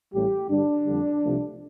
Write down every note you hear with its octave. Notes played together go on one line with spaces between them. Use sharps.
A1 A2 G3 G4
G2 D3 G3 D4
F2 D3 G3
C2 C3 F3 A3